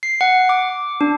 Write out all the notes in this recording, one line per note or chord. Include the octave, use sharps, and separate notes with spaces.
C7
F#5
D6
D4